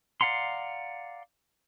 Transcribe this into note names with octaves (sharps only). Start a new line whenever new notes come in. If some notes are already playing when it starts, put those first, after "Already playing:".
D5 F5 F#5 A#5 C6